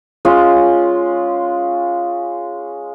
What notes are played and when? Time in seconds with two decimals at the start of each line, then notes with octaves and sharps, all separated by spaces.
0.25 G#3 C#4 F4